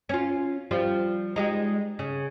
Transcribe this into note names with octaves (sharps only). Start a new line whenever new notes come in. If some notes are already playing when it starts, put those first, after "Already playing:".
C#4 F4
F3 G3 F4
G3 G#3 D#4
C#3